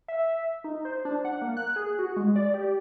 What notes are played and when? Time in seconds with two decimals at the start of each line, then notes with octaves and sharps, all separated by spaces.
0.08 E5
0.64 D#4
0.85 C5
1.05 D4
1.25 F#5
1.42 A#3
1.57 F#6
1.76 G#4
1.99 F#4
2.17 G#3
2.36 D5
2.54 G4